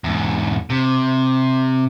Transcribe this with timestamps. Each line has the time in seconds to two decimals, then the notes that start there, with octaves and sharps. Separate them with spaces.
0.04 E2 G#2
0.70 C3